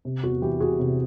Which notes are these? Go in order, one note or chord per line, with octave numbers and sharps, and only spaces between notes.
C3
E2 F#4
E3 G4
E2 F#4 G#4
C3